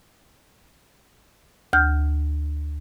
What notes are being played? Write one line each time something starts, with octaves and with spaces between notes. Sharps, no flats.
D2 F6 G6